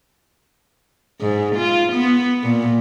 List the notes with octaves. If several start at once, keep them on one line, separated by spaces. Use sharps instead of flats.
G#2
F4
B3
A#2